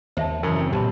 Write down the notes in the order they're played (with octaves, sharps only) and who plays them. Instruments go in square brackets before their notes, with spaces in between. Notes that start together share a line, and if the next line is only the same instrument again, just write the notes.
[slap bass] D#2 [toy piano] C5 E5 A5
[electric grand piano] F#2 [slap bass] C#3 [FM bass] E3 [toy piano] A#4
[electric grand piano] C4
[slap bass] B1 [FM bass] A#2 [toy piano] G4 A5 B5